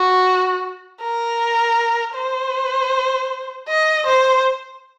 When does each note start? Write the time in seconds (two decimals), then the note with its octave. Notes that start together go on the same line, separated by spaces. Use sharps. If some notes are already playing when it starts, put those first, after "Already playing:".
Already playing: F#4
1.01 A#4
2.15 C5
3.68 D#5
4.06 C5